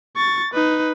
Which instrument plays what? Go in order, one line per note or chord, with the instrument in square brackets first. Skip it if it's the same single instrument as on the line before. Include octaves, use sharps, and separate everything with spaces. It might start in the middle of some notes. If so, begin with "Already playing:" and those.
[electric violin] C#6 A6
D#4 B4